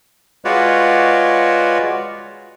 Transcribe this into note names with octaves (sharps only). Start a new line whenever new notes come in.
G#3 F4 F#4 B4 C#5 D5